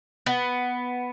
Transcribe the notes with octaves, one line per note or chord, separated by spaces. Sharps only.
B3